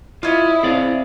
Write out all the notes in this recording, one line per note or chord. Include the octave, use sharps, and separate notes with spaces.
E4 F4 C#5 D#5
C4 G#4 C5 D5 F5